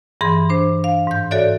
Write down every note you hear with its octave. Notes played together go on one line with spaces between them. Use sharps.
G2 E3 G#4 C6
D4 C5
F5
G#2 G6
F#4 A4 C#5 D5 E5